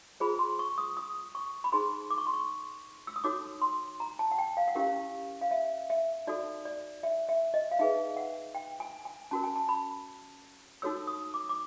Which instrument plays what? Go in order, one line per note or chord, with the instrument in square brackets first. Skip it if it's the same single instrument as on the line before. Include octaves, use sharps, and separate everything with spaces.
[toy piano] F4 G#4 C5 B5
C6
C#6
D#6
D#6
C#6
B5
D#4 G#4 C5 C6
D6
C#6
C6
C#6
E6
D#6
D#4 F#4 A4 C#5 D6
C6
A#5
A5
F#5
G5
F5
F#5
C#4 E4 G4 A#4 F5
F5
E5
E5
D#4 F#4 A4 D5
D5
E5
E5
D#5
F5
D#4 G#4 B4 E5
F#5
G5
G#5
G#5
C#4 F#4 A#4 A5
G#5
A5
B5
D#4 F#4 A4 C#5 E6
D#6
D6
D6